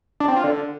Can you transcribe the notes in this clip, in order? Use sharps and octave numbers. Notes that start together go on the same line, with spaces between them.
D4
C4
F4
D3